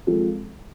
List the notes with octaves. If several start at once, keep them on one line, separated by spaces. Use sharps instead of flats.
F3 G#3 C4 F4 A4